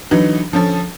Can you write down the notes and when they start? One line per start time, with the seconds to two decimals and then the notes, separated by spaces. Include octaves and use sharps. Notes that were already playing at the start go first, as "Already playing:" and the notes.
0.11 D3 E3 F#3 D#4
0.52 D3 F3 C#4 A4